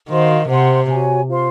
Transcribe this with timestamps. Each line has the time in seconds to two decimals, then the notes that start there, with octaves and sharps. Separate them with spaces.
0.09 D#3 F#4 C5 F5 C6
0.48 C3 C5 F#5 C6
0.89 F#4 C#5 G#5
1.29 F4 C5 F5 C6